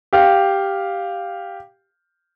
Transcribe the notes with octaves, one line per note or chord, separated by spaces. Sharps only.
G4 F5